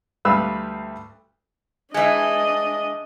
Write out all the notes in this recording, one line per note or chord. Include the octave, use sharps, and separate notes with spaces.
D2 G3 B4 F5 B5 E6
E3 G#3 D4 D#5